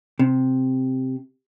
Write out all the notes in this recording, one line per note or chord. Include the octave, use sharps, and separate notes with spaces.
C3